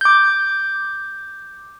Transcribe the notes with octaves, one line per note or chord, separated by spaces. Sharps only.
D6 G6